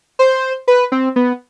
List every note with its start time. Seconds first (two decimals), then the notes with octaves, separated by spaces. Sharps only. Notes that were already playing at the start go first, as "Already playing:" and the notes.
0.19 C5
0.68 B4
0.92 C4
1.16 B3